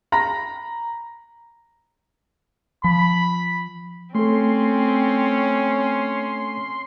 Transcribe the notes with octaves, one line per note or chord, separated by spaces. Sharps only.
A#5 B5 A#6
F3 B5
A3 C4 C#4 A4 C6